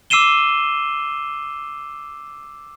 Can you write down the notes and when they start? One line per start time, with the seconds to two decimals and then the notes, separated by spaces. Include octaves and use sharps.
0.10 D6 E6 C7 D#7 E7 G7